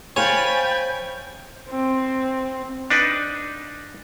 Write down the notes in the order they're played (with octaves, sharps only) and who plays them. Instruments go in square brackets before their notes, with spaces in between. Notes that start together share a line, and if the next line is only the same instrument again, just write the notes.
[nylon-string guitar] C5 F5 [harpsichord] C#5 [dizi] G5 [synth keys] G#5 B5 A6
[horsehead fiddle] C4
[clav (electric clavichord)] D4 D#4 B4